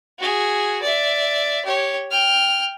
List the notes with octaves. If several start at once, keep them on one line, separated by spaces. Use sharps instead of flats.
F#4 G#4
D5 E5
G4 C#5
G5 F6